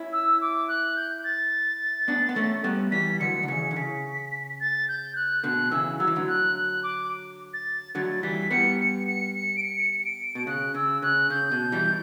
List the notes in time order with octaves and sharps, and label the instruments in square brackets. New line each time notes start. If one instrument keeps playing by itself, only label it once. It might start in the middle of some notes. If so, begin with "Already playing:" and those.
Already playing: [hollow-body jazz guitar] C#4 E4
[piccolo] E6
D6
F#6
G6
A6
[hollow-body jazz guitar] B3 D4
B3
A3 C#4
G3 B3
[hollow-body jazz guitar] E3 G3 [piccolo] B6
[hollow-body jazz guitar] D3 F#3 [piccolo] C#7
[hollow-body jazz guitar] D3
[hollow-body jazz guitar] C#3 E3 [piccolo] C#7
[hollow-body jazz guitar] D3
[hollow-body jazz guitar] C#3 [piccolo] B6
[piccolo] A6
G6
F#6
[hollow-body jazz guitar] B2 D3 [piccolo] F#6
[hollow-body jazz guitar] C#3 E3 [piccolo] E6
[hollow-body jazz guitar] F#3 [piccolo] E6
[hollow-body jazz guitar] E3
D3 F#3
[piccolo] F#6
F#6
D6
A6
[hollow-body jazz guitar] D3 F#3 [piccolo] A6
[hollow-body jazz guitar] E3 G3 [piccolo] B6
[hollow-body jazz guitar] G3 B3 [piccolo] C#7
[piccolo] C#7
C#7
C#7
D7
C#7
D7
[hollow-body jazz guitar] B2
[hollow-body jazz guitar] C#3 [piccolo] F#6
[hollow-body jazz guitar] C#3 [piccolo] E6
[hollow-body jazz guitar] C#3 [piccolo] F#6
[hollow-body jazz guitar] C#3 [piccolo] G6
[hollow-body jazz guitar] B2
E3 G3